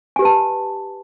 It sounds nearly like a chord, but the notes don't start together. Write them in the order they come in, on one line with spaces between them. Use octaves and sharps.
G#5 G4 B4 A5